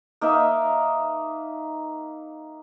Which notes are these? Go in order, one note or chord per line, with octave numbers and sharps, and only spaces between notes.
A#3 D#4 D#5 E5